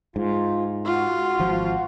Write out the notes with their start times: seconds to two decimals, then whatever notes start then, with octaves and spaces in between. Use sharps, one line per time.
0.16 G#2 F4
0.85 F4 F#4
1.40 G#1 F3